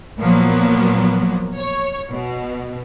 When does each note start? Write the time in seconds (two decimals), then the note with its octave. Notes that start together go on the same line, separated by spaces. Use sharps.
0.20 A#2 F3 F#3 A#3 B3
1.56 C#5
2.11 B2